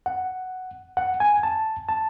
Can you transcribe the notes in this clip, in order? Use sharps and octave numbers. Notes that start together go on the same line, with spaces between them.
F#5
F#5
G#5
A5
A5